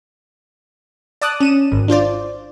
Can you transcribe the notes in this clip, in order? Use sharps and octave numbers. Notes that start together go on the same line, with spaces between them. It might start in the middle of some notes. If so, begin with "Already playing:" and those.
D5 A5 D6 D#6 F#6
C#4 D#7 E7
G#1
D4 F4 C5 D5